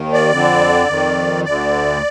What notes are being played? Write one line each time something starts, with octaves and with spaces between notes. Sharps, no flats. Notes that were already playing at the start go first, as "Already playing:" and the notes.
Already playing: D#2 D#3
D5
F2 D3
F2 D#3
D2 D3 D5